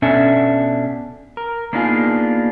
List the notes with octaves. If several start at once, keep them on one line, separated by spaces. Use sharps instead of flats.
B2 C#4 D4 A4 E5
A#4
A#3 B3 D4 D#4 F4 G#4